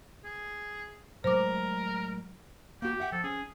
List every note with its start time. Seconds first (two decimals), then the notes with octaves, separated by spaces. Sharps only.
0.24 G#4
1.24 A2 F#3 G#3 A#4 C5 D6
2.82 A#3 F#4 G4
3.00 E5 F#5 G5
3.12 F3 A4
3.24 C#4 G#4